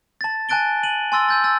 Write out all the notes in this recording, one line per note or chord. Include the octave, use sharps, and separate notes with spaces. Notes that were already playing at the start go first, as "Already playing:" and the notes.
A5 A6
G#5 A5 F#6 A6 D7 G7
D#7 F#7
G#5 C6 E6 A6
E6 G6 A6
E6 A6